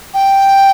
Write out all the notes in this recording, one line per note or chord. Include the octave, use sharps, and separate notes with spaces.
G5